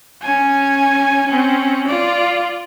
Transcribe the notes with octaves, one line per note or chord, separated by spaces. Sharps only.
C#4 G#5
C4 C#4
F4 D5